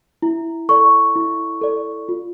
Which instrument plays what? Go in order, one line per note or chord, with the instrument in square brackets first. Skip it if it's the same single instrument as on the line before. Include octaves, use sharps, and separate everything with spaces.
[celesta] E4
A4 D5 C#6
E4
A4 D5
F4